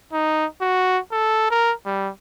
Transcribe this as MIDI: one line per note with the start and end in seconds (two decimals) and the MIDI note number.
0.13 0.46 63
0.61 0.99 66
1.12 1.50 69
1.51 1.73 70
1.86 2.10 55